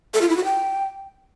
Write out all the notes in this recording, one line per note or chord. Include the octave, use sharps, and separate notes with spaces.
A4
F4
E4
F#4
G5